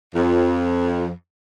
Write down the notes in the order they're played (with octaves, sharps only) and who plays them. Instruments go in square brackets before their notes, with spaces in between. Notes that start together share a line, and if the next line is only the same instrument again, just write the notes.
[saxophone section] F2